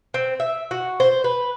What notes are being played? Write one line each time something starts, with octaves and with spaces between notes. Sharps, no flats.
C4
E5
F#4
C5
B4